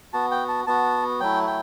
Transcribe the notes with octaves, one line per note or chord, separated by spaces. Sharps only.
B3 F#4 A5
G5
A5
B3 F#4 A5
F#3 A3 E4 G5
G5